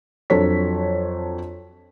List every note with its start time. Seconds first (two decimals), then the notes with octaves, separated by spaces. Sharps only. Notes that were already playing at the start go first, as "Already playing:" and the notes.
0.30 F2 F#3 D4 A4 C#5 B6